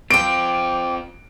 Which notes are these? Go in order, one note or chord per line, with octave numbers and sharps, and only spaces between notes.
C4 F4 C5 G5 D6 D7